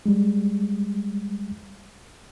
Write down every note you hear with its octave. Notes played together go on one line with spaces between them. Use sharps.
G3 G#3